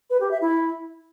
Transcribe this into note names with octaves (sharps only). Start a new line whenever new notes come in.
B4
G4
E5
E4